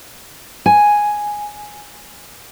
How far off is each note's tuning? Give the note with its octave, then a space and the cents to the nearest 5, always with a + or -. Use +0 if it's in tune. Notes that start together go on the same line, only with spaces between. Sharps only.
G#5 +0